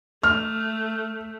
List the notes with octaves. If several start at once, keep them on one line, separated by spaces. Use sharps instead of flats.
A3 F6